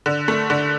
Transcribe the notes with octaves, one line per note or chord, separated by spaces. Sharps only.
D3
A3
D3